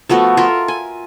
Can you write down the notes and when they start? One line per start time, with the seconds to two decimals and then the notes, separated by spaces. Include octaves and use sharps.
0.09 F3 A3 B3 F#4
0.37 F4 A4 A#4 E5
0.68 G#5